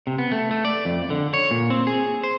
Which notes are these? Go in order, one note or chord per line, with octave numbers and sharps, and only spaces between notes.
C3
B3
A3
A3
D5
F2
D3
C#5
A#2
C4
G#4
C5